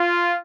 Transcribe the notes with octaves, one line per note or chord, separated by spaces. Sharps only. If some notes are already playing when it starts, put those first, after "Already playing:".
Already playing: F4